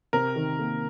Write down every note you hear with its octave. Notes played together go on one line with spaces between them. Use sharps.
C3 A#4
D#3
A#3